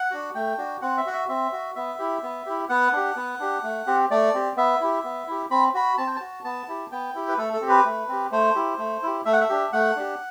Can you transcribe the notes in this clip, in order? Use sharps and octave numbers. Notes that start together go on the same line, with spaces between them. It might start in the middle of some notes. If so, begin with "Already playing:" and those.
Already playing: F#5
D4 F#4
A3 G5
D4 F#4
C4 F#5
E5
F#4 F#5
E5
C4 E5
F#4
B3 E5
E4 G4
B3
E4 G4
B3 F#5
D4 G4
B3
D4 G4
A3
C4 G4
A3 D5
C4 G4
B3 E5
E4 G4
B3
E4 G4
C4 B5
F#4 B5
C4 A5
G5
F#4 A5
B3 A5
E4 G4
B3 G5
E4 G4
B4
A3 A4
A4
C4 G4
B4
A3
C4 G4
A3 C5
E4 G4
A3
E4 G4
A3 E5
F#5
E5
D4 G4
A3 F#5
D4 G4